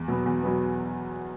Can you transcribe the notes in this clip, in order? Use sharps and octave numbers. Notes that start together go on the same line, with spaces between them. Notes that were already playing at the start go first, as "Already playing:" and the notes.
Already playing: E2
B2 F#3 B3
E2
B2 F#3 B3